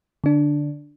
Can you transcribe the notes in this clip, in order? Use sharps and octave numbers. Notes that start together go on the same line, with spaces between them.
D3 D4